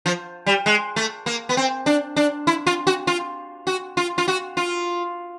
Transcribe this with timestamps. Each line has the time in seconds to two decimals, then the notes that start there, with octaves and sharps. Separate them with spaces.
0.06 F3
0.46 G3
0.66 G#3
0.96 A3
1.26 A#3
1.49 B3
1.57 C4
1.86 D4
2.16 D4
2.47 E4
2.67 F4
2.87 F#4
3.07 F4
3.67 F#4
3.97 F4
4.18 F4
4.28 F#4
4.57 F4